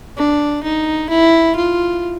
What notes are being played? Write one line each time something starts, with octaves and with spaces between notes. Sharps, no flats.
D4
D#4
E4
F4